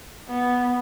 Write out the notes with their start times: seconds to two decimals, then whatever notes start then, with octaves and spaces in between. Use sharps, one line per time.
0.28 B3